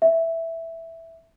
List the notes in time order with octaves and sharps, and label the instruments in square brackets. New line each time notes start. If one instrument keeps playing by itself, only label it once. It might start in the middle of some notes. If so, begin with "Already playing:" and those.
[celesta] E5